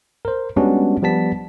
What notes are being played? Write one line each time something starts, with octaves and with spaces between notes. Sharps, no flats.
A#4 C5
G3 G#3 B3 C#4 D4 F#4
F3 G3 B3 A5 B6